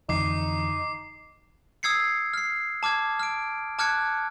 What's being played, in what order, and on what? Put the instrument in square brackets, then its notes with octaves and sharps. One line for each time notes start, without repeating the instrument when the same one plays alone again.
[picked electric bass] F2 D3 E3 [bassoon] D#4 [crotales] D6 C7
[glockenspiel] D#6 E6 G#6 C7 C#7
F6 C7
A5 D6 F6 G#6
F6 D7
A5 D6 F6 F#6 G#6 C#7